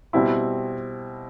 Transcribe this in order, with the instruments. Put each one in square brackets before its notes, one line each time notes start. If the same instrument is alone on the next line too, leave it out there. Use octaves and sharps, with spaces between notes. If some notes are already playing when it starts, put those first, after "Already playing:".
[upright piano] B2 G3 C4 E4